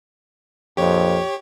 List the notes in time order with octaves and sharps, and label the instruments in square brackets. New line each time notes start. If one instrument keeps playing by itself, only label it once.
[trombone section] A#1 F2 [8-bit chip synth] G4 C#5